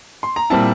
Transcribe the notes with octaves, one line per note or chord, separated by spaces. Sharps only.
C6
A#5
A#2 G3 C4 E4 A5